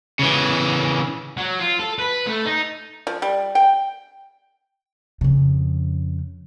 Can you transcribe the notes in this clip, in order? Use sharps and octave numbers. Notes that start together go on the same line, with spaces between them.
C#3 E3
F#3
F4
A4
B4
A3
D#4
F3
G3
G5
F2 C#3